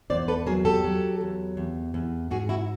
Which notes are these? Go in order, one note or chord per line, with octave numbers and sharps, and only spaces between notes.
E2 C5 D5
A4 B4
F#3 G#4 A#4
G4 A4
F#3
E2
E2
E2
G#2 F#4 G#4
E4 F#4